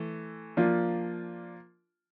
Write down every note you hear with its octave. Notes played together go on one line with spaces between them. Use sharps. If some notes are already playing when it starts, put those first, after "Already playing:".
Already playing: E3 A3
F3 A#3 D4 F4